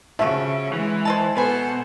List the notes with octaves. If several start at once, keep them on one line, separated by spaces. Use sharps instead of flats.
C#3 F3 A3 F#4 E5
E3 G#3
C5 D#5 A5
B2 A4 B4 C5 G#5